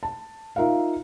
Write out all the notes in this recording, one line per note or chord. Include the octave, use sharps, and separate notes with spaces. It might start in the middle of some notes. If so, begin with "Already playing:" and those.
A5
D#4 F4 A#4 E5 F5